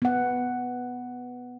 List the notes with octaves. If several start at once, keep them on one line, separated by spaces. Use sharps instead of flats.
B3 F#5